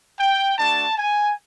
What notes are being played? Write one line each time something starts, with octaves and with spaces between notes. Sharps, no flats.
G5
A3 D4 F#4 A5
G#5